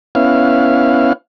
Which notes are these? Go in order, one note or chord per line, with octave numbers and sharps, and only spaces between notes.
B3 C#4 E4 F5